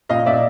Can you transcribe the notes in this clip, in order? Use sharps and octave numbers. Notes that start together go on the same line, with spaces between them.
A#2 D#5 F5
A#2 D5 E5